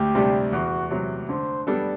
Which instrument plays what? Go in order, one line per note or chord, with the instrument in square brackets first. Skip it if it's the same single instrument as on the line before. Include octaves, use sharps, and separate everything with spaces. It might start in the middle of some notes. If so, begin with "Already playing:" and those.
Already playing: [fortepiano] D2 [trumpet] G4
[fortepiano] C3 G3 D4
[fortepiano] E2 [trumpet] F#4
[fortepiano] C3 F#3
[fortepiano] D3 [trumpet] C5
[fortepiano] G3 B3 D4 A4